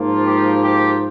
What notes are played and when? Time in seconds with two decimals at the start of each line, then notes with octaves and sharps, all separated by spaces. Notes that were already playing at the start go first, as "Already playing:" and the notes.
Already playing: G#2 F3 A#3 F4
0.25 G4
0.62 G4